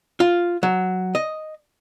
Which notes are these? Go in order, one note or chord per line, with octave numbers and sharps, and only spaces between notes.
F4
F#3
D#5